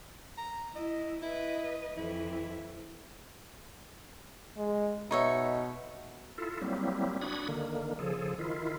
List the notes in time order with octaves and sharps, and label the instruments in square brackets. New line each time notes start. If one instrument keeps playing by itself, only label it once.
[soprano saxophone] A#5
[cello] E4 [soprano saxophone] D#5
[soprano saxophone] E4 [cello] B4 D#5
[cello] F2 E3 [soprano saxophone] E4
[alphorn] G#3
[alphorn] B2 [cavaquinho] D#4 C#5 E5
[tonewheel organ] E4 F4 A4
F#3 G3 A#3 C4 E4
D4 F#4 B5 D#6 G#6
D3 D#3 A#3
C#3 F3 G#4 A4
D#3 E4 F4